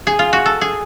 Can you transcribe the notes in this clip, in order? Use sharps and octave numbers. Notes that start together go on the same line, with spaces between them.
G#4
F4
F#4
A4
G#4